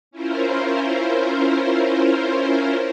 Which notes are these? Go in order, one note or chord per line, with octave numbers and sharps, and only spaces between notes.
C#4 E4 F4 A#4 C5